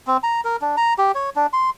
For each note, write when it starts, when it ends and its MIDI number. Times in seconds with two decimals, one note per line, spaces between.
0.07 0.17 60
0.23 0.41 82
0.44 0.57 70
0.62 0.76 62
0.77 0.94 82
0.98 1.12 67
1.15 1.30 73
1.36 1.47 62
1.53 1.70 84